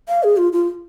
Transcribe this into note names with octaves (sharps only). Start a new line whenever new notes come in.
F5
G#4
F4
F4